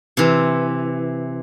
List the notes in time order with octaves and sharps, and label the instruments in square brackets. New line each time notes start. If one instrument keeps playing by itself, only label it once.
[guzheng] C3 E3